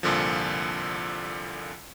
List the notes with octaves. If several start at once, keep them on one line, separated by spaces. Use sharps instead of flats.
C2 A#2 D3 F3